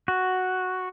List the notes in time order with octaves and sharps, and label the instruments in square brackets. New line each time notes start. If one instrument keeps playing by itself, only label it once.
[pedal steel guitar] F#4